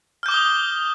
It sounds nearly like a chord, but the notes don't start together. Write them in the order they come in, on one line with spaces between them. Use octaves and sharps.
F6 G6 D6 G7 D#6